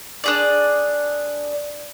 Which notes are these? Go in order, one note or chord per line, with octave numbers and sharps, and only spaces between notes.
D4 G#4 D5